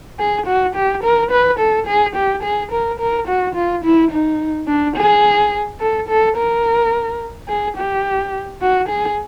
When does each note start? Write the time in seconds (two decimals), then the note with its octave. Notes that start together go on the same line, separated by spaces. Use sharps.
0.19 G#4
0.47 F#4
0.75 G4
1.04 A#4
1.31 B4
1.59 A4
1.87 G#4
2.16 G4
2.43 G#4
2.72 A#4
3.00 A#4
3.28 F#4
3.55 F4
3.84 E4
4.11 D#4
4.68 D4
4.97 G#4
5.80 A4
6.09 A4
6.37 A#4
7.48 G#4
7.77 G4
8.61 F#4
8.89 G#4